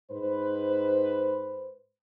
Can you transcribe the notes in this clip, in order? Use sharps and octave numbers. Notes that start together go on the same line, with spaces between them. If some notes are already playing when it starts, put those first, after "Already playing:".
G#2 B4 C5